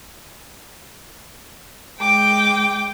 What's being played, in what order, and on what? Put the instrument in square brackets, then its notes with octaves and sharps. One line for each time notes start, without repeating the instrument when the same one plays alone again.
[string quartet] G#3 G5 D6